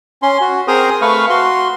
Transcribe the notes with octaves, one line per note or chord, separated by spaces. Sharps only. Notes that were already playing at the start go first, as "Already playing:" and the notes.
C#4 C6
F#4
C4 G#4 A#4 C5 A#5 D#6
A3 B4 F5 C#6
F#4 C6